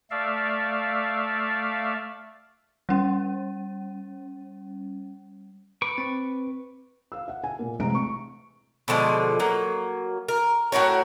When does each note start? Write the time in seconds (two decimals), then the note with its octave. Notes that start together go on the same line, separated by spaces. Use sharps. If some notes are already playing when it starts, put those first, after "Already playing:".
0.11 A3 D5 E5 F5
2.89 G3 C#4
5.82 B4 C#6 D6
5.98 C4
7.12 F5 E6
7.28 E5 F#5
7.44 G#5
7.59 A#2 A#3
7.79 A1 C3 G#3 A#5 D7
7.95 C#6
8.88 B2 D3 F3 G#3
9.40 F#3 A#3
10.28 A#4
10.72 A2 F#4 A#4 C#5